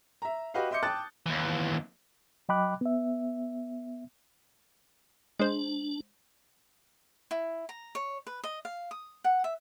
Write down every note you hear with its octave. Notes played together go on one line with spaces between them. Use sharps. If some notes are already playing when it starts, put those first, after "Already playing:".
E5 A#5
F#4 G4 B4 D#5 F5
D#5 E5 C6 D6 G6 C#7
G5 A5 D6 D#6 F#6 A6
D#2 E3
F#3 D#5 G5 B5 D6 F#6
B3 E5
G#3 D4 C5
E4
A#5
C#5
B4
D#5
F5
D#6
F#5
E5